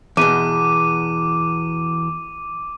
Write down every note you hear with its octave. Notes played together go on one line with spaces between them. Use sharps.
E2 B2 D6 D#7